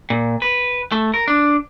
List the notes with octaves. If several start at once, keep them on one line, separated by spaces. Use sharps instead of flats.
A#2
B4
A3
A#4
D4